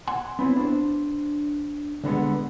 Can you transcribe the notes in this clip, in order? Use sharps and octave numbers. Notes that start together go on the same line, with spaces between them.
F#5 G#5 C6
B3 C4 E4 C#5
D4 C5
C2 D3 G#3 B3